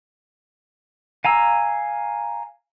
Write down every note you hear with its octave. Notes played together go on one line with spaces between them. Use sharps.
F5 G#5 A#5 E6